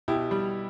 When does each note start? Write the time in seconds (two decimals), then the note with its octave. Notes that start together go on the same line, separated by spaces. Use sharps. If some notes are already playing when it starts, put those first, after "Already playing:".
0.08 B2 E4 G4
0.31 G3